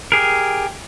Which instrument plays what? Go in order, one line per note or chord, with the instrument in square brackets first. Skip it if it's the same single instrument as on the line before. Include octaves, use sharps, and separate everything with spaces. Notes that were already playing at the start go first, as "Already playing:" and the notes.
[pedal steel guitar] G4 G#4 A#4